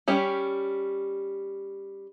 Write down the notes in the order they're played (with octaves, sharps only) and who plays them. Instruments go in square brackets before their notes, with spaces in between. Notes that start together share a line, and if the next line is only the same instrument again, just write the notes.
[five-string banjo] G3 C#4 G4